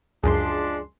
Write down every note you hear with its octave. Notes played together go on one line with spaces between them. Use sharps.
C#2 F#2 F3 G#3 D4 G#4 C6